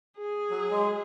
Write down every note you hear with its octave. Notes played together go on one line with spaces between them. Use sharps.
G#4
F#3
G#3